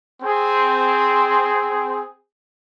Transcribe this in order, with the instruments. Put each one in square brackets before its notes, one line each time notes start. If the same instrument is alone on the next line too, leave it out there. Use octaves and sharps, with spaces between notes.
[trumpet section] C4 G#4